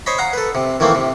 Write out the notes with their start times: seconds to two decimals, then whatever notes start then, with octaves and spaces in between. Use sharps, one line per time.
0.06 C5 C#5 D#5 B5
0.18 F5 F#5 A#5
0.33 A4 B4
0.55 C3
0.80 D#3 E3 A3 A#3 C4
0.95 C3